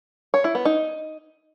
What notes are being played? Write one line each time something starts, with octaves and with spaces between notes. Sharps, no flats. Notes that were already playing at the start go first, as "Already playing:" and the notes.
C#5
E4
B3
D#4